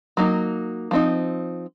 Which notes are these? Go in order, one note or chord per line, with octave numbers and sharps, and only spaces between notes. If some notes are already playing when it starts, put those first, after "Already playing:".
F#3 A#3 D#4
F3 C4 D#4